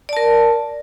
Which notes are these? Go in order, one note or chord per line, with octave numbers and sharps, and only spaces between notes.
A#4 D5 A5